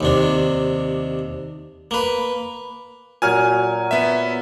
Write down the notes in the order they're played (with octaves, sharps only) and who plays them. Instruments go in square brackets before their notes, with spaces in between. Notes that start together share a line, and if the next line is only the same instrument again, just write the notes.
[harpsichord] D#2 C3 D4
A#3 B4
[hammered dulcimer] A#2 F#3 [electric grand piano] G#5 F6 G#6
[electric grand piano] B3 E5